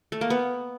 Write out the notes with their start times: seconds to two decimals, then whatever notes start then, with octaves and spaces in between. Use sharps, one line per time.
0.12 A3
0.21 A#3
0.30 B3